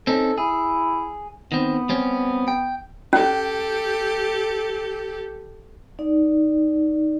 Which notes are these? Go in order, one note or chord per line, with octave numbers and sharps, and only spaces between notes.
C4 C#4 D#4 A4
E4 G#4
D#3 B3 C4
G3 C4 C#4
G5
C#4 G4 A4
D#4 D5